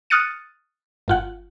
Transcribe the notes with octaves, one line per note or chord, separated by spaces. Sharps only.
D#6 F6 F#6 A6 C#7 D#7
G1 F4 F#5